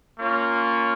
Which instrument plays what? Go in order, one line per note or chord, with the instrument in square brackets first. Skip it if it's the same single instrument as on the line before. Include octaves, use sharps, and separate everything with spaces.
[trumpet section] A#3 C#4 F4 C#5